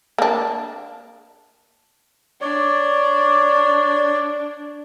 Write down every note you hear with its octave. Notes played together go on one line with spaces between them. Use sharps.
A#3 D4
D4 C#5 D5